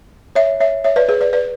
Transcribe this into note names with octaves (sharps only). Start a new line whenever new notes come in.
C#5 E5
C#5 E5
C#5 E5
B4 D5
G#4 B4
B4 D5
B4 D5